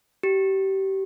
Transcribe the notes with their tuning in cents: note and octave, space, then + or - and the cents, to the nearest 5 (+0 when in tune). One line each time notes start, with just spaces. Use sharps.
G4 -25